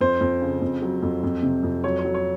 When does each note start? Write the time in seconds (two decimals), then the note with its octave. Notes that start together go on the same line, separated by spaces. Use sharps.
0.01 F2 C5
0.21 F2
0.41 C#3
0.62 F2
0.82 F#3
1.02 F2
1.23 F2
1.43 C3
1.63 F2
1.84 F#3 C#5
1.99 C#5
2.05 F#3
2.14 C#5